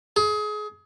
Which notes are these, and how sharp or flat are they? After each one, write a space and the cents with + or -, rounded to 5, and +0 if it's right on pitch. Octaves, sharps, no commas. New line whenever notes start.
G#4 +25